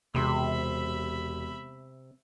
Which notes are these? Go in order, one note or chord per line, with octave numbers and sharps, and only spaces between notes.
E1 C3 E5 B5 C6